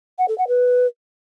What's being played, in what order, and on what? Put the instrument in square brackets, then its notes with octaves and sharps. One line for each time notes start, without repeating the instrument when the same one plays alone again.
[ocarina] F#5
A4
F#5
B4